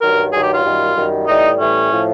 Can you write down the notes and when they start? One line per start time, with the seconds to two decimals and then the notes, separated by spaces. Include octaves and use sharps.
0.01 G2 D#3 F#3 A#4
0.32 G2 D#3 F#3 G#4
0.43 G4
0.53 F4
0.64 F#2 D#3 G3
0.96 F#2 D#3 G3
1.27 A2 E3 G3 D#4
1.58 A2 E3 G3 C#4
1.91 A2 F3